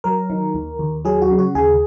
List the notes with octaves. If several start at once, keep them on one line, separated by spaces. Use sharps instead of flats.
F#3 A#4
D#3
D#2
D#2
F#3 G#4
F#4
C#3
F#4
D#2 G#4